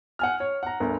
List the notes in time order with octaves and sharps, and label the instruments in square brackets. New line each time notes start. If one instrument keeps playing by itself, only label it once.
[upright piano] F#5 G#5 F6
C#5
F#5 A#5
G1 D2 A#4